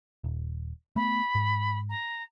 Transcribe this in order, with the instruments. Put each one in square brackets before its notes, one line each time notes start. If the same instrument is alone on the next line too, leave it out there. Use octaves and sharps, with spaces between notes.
[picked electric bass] D#1
[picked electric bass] A3 B3 [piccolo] B5
[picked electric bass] G#2
[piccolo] A#5